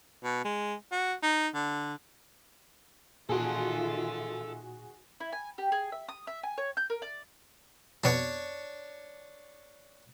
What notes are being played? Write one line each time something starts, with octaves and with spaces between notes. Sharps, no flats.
B2
G#3
F#4
D#4
D3
A#2 D#3 F4 F#4 G#4 A4 E5 C6
E4
G#5
G4
G#4
E5
D#6
E5
G#5
C#5
G6
A#4
D5
F2 B2 D4 C#5 C#6